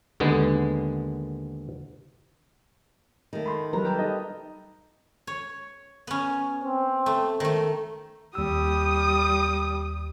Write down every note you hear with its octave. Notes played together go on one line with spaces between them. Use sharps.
D#2 D3 G#3 B3
D#3 A3
B5 C6
F#3 G3 A#4 B4 A#5
G4 A4
D#4 D#5
C#5
B3 C#4
C4
A3
D#3 A3
D#2 G3 D#6 E6